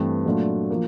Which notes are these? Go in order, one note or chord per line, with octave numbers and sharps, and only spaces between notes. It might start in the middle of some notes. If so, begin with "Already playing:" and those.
Already playing: G2 E3 A3 C4
A#2 F#3 A3 D4 F4
F3 A#3